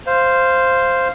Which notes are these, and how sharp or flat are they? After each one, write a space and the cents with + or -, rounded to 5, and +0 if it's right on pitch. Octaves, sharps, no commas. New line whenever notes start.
C5 +0 F5 -10